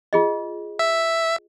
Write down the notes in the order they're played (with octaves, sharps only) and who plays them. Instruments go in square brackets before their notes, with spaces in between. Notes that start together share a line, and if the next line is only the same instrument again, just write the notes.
[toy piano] F4 G#4 D#5
[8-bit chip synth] E5